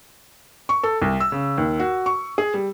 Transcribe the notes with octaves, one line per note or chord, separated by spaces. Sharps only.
C#6
A4
C2
E6
C#3
D#2
F#4
C#6
G#4
G3